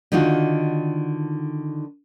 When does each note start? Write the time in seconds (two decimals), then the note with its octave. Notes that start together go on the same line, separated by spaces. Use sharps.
0.12 D3 D#3 D4 D#4 F4 F#4